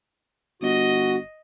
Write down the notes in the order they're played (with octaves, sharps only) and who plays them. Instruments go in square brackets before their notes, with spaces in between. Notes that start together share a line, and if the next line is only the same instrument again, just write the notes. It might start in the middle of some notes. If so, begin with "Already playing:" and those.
[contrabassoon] G1 [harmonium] F#4 [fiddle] D#5